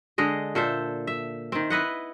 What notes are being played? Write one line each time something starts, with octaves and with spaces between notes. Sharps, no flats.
D3 G#3 D#5
A#2 A4 C5 E5
E5
D#3 C4
E4 B4 D#5 F#5